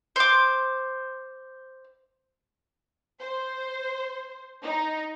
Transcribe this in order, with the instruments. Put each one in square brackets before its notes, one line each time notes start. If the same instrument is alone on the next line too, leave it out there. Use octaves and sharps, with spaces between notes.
[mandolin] C5 D6
[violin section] C5
D#4